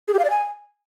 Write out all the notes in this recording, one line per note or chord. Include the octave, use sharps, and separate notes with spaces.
G#4
G4
F5
D5
G#5